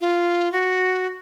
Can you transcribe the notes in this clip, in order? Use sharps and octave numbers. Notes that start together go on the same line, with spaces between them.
F4
F#4